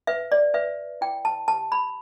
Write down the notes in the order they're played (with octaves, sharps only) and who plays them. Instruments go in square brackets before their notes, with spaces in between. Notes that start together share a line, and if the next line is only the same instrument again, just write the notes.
[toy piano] B4 E5
D5
B4 E5
E4 G5
A5
G4 A5
B5